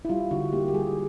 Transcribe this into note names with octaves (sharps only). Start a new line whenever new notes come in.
E4
G3 F4
D3 F#4
A#3 G4
G4
G3 G#4